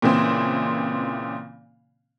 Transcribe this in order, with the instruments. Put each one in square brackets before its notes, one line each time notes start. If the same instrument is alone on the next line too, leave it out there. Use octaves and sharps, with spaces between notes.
[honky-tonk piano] A#2 C#3 E3 C4